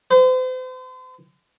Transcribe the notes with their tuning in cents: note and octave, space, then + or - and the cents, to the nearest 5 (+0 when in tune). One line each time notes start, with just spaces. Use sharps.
C5 -40